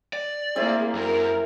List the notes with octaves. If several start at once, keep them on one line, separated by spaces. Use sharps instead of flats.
D5
A#3 C4 E4 G#4
F#2 A#4